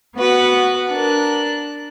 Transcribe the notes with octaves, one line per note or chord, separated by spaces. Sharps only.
B3 F#4 B4
D4 A#4 F#6